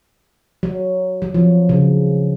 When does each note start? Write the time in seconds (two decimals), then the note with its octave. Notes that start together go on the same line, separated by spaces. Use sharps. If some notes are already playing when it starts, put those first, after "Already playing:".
0.63 F#3
1.22 F#3
1.34 F3
1.69 C#3